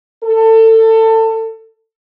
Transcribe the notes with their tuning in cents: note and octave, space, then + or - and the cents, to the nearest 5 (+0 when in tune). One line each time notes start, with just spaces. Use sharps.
A4 +25